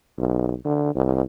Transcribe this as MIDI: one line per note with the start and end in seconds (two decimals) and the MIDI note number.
0.17 0.53 35
0.65 0.92 50
0.95 1.23 36